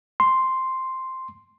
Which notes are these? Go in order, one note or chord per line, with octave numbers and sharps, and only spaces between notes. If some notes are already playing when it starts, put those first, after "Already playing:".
C6